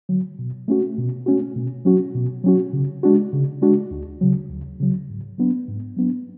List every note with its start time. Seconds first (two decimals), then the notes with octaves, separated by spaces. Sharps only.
0.09 D3 F#3
0.39 B2
0.68 A3 C#4 F#4
0.98 B2
1.26 A3 C#4 F#4
1.56 B2
1.85 F#3 C#4 F#4
2.15 B2
2.44 F#3 C#4 F#4
2.73 C#3
3.03 G#3 D4 F#4
3.33 C#3
3.62 G#3 D4 F#4
3.91 D2
4.21 C#3 F#3
4.50 D2
4.80 C#3 F#3
5.09 G#2
5.38 F#3 B3 D4
5.68 G#2
5.97 F#3 B3 D4